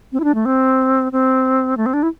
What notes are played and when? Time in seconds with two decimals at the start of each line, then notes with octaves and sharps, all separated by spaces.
0.12 C4
0.20 E4
0.24 D4
0.35 A3
0.45 C4
1.12 C4
1.77 A3
1.86 C4
1.93 D4
2.03 E4